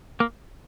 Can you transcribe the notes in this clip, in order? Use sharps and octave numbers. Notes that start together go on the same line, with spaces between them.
A#3